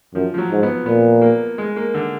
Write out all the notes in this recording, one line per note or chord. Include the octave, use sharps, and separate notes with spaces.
F#2 F3
F3
F#3
G#2
B3
A#2 B3
A#3
G#3
A#3
D3